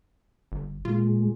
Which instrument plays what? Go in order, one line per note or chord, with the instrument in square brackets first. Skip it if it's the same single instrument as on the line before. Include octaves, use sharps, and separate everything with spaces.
[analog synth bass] G1
[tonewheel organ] A#2 G#3 [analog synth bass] F4